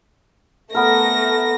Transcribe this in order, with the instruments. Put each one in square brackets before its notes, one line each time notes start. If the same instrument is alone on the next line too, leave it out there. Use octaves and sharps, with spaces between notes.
[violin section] A3 A#6 [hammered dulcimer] B3 A#4